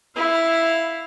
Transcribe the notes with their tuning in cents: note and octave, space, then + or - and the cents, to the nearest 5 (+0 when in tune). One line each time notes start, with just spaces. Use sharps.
E4 +0 F5 +0